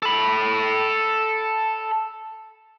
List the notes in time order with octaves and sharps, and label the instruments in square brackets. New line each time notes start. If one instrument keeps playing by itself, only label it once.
[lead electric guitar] A4 B5